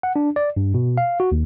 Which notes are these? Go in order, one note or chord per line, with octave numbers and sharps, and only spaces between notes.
F#5
D4
D5
G2
B2
F5
F#4
D#2